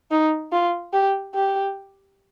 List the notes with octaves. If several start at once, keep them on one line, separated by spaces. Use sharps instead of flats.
D#4
F4
G4
G4